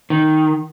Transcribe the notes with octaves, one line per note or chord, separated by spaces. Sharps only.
D#3